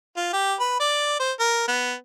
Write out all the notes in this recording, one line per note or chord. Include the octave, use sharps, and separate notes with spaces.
F4
G4
B4
D5
C5
A#4
B3